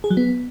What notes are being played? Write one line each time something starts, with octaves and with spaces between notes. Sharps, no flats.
G#4
F#3
B3